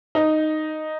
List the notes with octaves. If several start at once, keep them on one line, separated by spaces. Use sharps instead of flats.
D#4